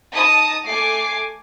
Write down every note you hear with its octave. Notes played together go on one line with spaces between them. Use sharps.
D#4 A5 D#6 A#6
A3 G#5 D6 C7